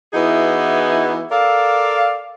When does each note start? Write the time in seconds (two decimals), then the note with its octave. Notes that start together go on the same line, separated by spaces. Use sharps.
0.13 E3 B3 D#4 E4 F#4 G#4
1.31 A4 A#4 D5 F5